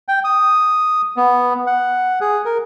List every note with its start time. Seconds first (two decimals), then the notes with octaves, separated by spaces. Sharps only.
0.08 G5
0.24 D#6
1.16 B3
1.67 F#5
2.21 G#4
2.45 A#4